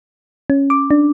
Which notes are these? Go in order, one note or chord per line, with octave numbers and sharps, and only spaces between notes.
C#4
D6
D4